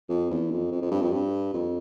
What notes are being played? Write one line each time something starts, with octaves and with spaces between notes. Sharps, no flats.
F2
E2
F2
F2
F2
G2
F2
G2
F2